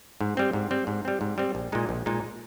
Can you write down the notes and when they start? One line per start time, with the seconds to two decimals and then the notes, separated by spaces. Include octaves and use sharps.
0.21 G#2
0.37 G3 C4
0.53 G#2
0.71 G3 C4
0.87 G#2
1.05 G3 C4
1.21 G#2
1.38 G3 C4
1.55 A#1
1.72 A#2 G#3 D#4
1.89 A#1
2.06 A#2 G#3 D#4